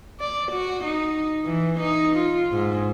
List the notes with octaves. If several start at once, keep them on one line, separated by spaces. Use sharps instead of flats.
D5
F#4
D#4
E3
D#4
F4
G#2